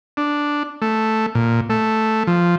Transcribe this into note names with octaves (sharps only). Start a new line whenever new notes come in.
D4
A3
A#2
A3
F3